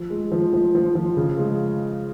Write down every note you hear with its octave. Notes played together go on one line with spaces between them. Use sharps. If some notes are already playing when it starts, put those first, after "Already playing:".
Already playing: F3
G#3
F3
F3
F3
F3
C#3
G#3